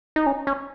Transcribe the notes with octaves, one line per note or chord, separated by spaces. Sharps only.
D#4
C#4
C#4